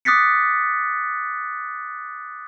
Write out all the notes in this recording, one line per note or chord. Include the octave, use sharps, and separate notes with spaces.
D6 D#6 F#6 A6 B6 C#7